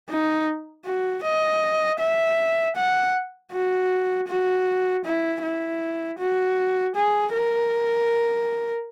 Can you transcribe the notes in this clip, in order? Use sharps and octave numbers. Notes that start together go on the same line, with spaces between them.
D#4
F#4
D#5
E5
F#5
F#4
F#4
E4
E4
F#4
G#4
A#4